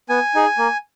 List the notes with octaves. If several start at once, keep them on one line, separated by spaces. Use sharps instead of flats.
B3 G#5
D#4 G#4
A#3